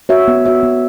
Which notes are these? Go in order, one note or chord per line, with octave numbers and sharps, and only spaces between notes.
F#4 C#5 E5
B3
F#4 C#5 E5
B3